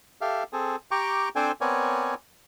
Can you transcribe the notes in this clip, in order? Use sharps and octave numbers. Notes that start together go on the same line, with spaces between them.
G4 A4 E5 F5
C4 G#4 A4
G4 G5 A#5 C#6 D6
C4 D4 A4 C5 G5 G#5
B3 C4 A#4 C#5 D5 G#5